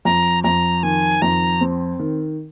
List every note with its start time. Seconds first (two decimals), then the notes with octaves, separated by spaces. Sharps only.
0.05 F2 A#5
0.44 F2 A#5
0.83 D#3 G#5
1.22 F2 A#5
1.61 C4
1.99 D#3